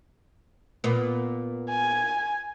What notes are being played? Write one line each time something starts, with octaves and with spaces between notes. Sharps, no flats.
A#2 B3
G#5